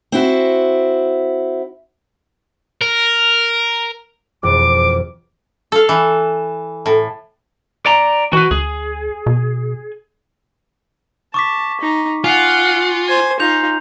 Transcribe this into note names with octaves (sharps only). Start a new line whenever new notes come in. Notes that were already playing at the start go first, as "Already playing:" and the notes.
C4 E4 F#4
A#4
E1 F2 D6
A4 F5
E3
A2
D5 A#5
E3 F#4 B4
D2 G#4
B2
A5 C#6 D6 B6
D#4
F4 F#5 G#5 C7
C5 G#5
D#4 F4 G6 F7